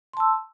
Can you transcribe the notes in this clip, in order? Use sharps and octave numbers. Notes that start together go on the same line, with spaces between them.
A5 C6 E6